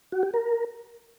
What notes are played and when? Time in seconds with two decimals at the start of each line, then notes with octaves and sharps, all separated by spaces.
0.12 F#4
0.23 G4
0.34 A#4